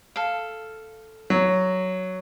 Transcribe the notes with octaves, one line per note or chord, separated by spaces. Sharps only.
A4 F5
F#3